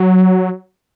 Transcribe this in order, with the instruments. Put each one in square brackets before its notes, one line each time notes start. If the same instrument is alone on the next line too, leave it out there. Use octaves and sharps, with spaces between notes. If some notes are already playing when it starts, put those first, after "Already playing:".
Already playing: [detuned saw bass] F#3